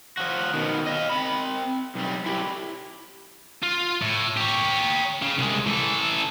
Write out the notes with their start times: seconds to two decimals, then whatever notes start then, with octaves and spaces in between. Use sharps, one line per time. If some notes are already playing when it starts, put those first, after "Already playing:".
0.17 F3 F#4
0.54 B2 D#3
0.86 D#5 F5
1.09 C4 B5
1.96 B1 G3
2.26 E4 G4
3.63 F4
4.02 A2
4.37 G4 C#5
5.22 C#3
5.38 C2 G#3
5.66 E3 A4